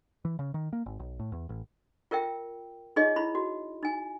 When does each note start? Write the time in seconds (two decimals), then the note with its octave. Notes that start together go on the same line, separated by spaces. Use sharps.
0.25 E3
0.39 C#3
0.54 D#3
0.73 A#3
0.86 G#1
0.99 B1
1.19 A2
1.32 E2
1.49 A1
2.11 F4 A#4 E5 G5
2.96 D#4 F4 G#4 C#5 D#5
3.16 E4 B5
3.35 F#4
3.83 D#4 G#5